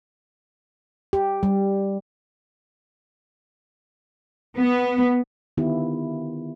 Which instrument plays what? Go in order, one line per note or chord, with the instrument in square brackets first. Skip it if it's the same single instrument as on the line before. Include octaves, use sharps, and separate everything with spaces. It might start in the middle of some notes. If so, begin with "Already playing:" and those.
[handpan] G4
G3
[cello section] B3
[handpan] D3 D#3 B3 E4 F4 G4